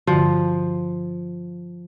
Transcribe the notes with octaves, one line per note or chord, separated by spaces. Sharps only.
G2 D3 F3 F#4